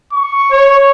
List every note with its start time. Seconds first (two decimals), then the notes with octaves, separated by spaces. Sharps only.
0.13 C#6
0.52 C#5